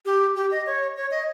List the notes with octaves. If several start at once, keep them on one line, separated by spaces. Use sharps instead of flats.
G4
G4
D#5
C#5
C#5
D#5